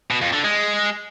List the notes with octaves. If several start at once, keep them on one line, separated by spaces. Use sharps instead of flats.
B2
F2
D3
G#3